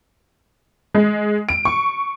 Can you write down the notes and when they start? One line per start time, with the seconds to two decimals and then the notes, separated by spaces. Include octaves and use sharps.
0.95 G#3
1.49 D7
1.65 C#6